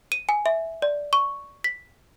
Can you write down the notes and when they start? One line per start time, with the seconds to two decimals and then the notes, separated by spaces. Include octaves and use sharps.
0.12 D#7
0.29 G#5
0.46 E5
0.82 D5
1.13 C#6
1.64 B6